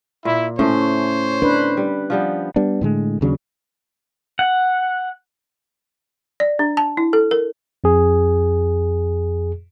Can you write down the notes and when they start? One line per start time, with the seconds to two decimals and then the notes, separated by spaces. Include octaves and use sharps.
0.25 A#2 E4
0.59 A2 A3 C#4 C5 C#5
1.42 D4 B4
1.77 G3
2.10 F3 G3 B3
2.56 G3 B3 D4
2.81 A2 D3 G#3
3.21 D#2 C#3 F#3 D4
4.39 F#5
6.40 D5
6.59 D4
6.77 A5
6.97 E4
7.13 A4
7.31 A#4
7.84 F2 G#4